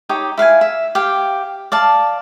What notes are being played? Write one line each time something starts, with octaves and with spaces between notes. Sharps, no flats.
D#4 G4 C#5 G5
E4 F5 F#5 G#5
E5
G4 F5 G5
D5 F5 A5